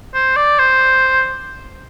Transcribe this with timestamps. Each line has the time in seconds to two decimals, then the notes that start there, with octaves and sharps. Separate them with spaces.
0.14 C5
0.36 D5
0.59 C5